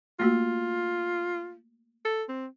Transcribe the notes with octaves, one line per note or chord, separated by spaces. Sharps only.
A3 A#3 F4 F#4
A4
C4